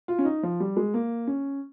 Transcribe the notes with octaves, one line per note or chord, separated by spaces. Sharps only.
F4
C#4
D#4
F3
G3
G#3
A#3
C#4